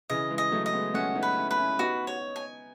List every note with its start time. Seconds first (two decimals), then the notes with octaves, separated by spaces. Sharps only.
0.10 C#3 E3 D#5
0.31 E3 G#3
0.38 D#5
0.52 F#3 A3
0.66 D#5
0.73 G#3 B3
0.94 A3 C#4 F#5
1.15 B3 D#4
1.23 B4
1.37 C#4 E4
1.51 B4
1.58 C#4 E4
1.79 B3 D#4 F#4
2.07 C#5
2.36 G#5